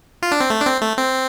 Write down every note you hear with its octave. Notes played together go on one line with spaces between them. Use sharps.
F4
D4
C4
A3
D4
C4
A3
C4